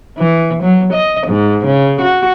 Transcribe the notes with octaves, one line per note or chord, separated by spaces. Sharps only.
E3
F#3
D#5
G#2
C#3
F#4